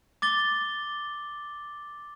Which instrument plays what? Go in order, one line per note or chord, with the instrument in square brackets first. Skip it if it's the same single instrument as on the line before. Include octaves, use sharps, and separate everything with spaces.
[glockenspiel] D6 A6 G7